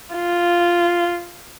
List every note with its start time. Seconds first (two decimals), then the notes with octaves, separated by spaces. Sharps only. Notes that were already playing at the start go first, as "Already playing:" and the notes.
0.15 F4